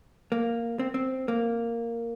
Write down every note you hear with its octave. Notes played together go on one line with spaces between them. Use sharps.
A#3
C4
C4
A#3